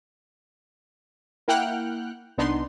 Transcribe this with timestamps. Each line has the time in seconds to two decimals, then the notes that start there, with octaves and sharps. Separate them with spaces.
1.48 A#3 E4 F#5 G5 F6 F#6
2.38 C2 B3 D4 D#4 C6